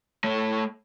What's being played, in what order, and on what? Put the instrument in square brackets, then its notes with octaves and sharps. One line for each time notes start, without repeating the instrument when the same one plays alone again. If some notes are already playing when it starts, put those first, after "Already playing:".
[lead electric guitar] A3 C#5